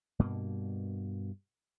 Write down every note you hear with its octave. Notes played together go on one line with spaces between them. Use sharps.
G2 B2 A#3